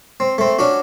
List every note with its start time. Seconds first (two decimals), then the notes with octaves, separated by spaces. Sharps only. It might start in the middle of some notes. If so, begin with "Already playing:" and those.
0.20 C4
0.38 A3 C4
0.59 C#4 D4 F#4